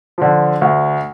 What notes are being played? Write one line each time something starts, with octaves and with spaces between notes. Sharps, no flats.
D3 F3
D2